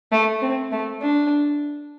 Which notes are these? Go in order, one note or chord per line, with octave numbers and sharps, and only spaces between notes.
A3
C4
A3
D4